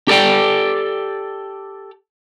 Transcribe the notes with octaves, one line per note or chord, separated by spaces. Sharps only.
G4 A4 D5 G5